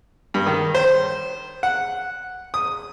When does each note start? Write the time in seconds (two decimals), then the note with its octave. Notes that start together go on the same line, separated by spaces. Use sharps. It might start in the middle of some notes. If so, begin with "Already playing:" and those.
0.34 G2
0.46 D#3
0.75 C5
1.63 F#5
2.54 D#6